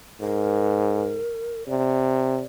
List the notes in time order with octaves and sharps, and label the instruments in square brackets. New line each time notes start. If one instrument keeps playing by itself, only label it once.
[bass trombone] G#2 [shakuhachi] A#4
[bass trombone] C3 [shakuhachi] D5